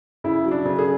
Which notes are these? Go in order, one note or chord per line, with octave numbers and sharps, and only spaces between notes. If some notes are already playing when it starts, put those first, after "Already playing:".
C#3 E4
F#3
D4
C#3
G#4